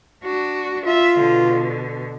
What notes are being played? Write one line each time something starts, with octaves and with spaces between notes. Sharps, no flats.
D4 F#4
F4 E5
B2 D3